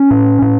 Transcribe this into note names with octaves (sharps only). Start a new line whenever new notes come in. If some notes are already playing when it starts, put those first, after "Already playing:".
Already playing: C#4
A2
A2